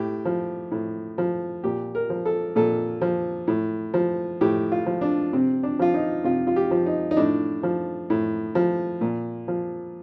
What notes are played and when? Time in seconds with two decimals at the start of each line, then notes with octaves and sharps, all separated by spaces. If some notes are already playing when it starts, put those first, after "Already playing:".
Already playing: A2 G4
0.25 F3
0.72 A2
1.18 F3
1.64 A#2 G4
1.95 A#4
2.10 F3
2.26 A4
2.56 A#2 A4
3.01 F3
3.48 A2
3.94 F3
4.41 A2 G4
4.72 F4
4.86 F3
5.01 D4
5.33 C3 C4
5.63 D4
5.79 F3 F4
5.94 D#4
6.24 C3 F4
6.47 F4
6.56 G4
6.71 F3
6.86 D#4
7.11 D#4
7.17 A2 D4
7.63 F3
8.10 A2
8.55 F3
9.01 A#2
9.48 F3